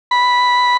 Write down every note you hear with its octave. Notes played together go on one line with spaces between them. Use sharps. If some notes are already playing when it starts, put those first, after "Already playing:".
B5